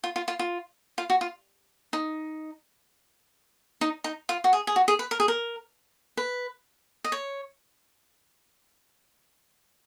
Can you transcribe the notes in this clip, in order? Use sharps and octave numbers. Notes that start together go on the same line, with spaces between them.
F4
F4
F4
F4
F4
F#4
F4
D#4
D#4
D#4
F4
F#4
G#4
G#4
F#4
G#4
B4
A#4
G#4
A#4
B4
D#5
C#5